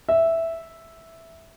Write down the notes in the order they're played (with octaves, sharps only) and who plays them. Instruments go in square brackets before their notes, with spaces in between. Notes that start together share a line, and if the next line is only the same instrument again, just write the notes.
[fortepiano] E5